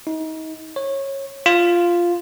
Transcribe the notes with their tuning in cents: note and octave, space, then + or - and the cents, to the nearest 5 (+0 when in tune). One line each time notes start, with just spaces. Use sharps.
D#4 +30
C#5 -20
F4 -5